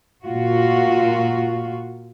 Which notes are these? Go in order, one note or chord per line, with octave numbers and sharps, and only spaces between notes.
A#2 F4 F#4